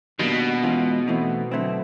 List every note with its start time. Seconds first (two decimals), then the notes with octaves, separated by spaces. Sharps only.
0.19 B2 D#3 G3 A#3 D4
0.63 G#2 E3 G#3 C#4 F4
1.08 E3 A3 C4 D#4
1.51 D3 F#3 A3 C4 E4